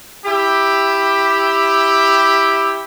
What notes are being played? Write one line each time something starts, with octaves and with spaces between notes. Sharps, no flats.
E4 G4